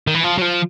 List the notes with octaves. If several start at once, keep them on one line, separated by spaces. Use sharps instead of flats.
D#3
E3
F3
F#3
F3